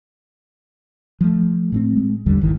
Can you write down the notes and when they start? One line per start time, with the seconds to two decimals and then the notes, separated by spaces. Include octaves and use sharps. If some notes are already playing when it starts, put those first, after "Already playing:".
1.21 F3 A3
1.72 A2 A3 C4
1.96 G#3
2.26 A#1 E2 D3 G3
2.41 G#1 D#3 E3